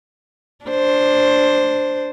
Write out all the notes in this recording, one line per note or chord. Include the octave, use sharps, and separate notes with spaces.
D4 C5